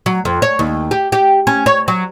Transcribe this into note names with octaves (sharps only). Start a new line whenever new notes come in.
F#3
F2
C#5
D#2
G4
G4
C#4
C#5
F#3